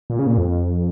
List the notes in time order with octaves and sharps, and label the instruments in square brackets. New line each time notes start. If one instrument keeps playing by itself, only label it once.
[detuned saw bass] A#2
C#3
A#2
F2